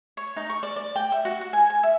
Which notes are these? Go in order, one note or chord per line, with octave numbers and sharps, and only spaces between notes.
C#5
D#4
C#6
D5
D5
G5
E5
F#4
F#4
G#5
G#5
E5